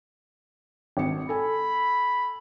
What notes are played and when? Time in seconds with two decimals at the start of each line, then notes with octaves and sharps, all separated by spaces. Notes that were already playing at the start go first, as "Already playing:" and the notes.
0.97 G#1 C#7
1.29 A4 G#5 B5